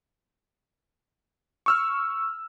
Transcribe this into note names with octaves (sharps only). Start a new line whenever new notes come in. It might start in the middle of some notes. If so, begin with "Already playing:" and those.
C#6 E6 F6